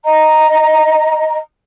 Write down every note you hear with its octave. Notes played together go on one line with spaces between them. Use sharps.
D#5 A#5